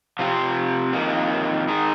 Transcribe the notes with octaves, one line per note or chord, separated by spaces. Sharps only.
C3 F3 C4 F4
F2 D#3 A#3
D#3 G#3 D#4